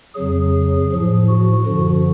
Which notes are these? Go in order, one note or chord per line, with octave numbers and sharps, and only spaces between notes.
F2 C#3 F#3 G#4
A2 F3
F#4
F#2 D3 F3